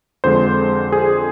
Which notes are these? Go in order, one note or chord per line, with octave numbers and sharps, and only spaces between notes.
F2 D3 G#3 C5
G#4